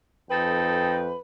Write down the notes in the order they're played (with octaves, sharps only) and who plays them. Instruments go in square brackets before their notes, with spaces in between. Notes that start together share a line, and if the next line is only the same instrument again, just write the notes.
[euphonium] F2 [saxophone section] D#4 G#4 A4 [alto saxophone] B4 [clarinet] G5